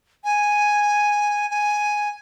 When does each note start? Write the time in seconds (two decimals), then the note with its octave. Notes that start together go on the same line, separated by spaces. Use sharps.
0.24 G#5
1.50 G#5